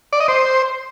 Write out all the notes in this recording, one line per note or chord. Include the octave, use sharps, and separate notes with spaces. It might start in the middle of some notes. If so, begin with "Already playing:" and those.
D5
D#5
C5